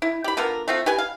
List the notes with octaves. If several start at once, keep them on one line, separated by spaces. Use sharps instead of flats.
E4
G4 B5
D3 B3 F4 A#4
A3 C4 F4
G4 B4 G#5
F5